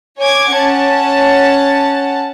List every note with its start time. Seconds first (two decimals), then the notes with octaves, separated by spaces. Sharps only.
0.20 C#5 G#5 D6 G#6
0.53 C#4 F#5 A5